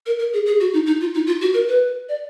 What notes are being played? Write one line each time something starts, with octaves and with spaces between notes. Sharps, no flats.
A#4
A#4
G#4
G#4
F#4
D#4
D#4
F4
D#4
F4
F#4
A#4
B4
D5